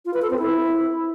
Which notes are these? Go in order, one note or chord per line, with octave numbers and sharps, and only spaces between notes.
F4
B4
A4
C4
E4